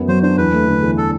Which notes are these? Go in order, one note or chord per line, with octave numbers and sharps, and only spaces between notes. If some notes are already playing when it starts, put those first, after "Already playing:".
Already playing: F#2 B3
F#3 C5
D4 C5
E2 B4
A3
D3
E2
A4